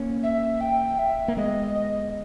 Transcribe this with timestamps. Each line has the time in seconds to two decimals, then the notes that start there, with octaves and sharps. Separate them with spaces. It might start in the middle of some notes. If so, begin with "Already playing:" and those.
Already playing: A#3 C#4
0.23 E5
0.61 G5
0.99 E5
1.28 A#3
1.37 G#3 B3 D#5
1.75 D#5